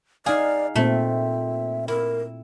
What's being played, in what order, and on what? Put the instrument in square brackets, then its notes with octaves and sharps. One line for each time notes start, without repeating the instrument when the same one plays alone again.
[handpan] D#4 F5 [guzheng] G#4 [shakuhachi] D5
[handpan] A#2 C4 [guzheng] A3 [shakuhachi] E5
[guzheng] E4 [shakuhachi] A#4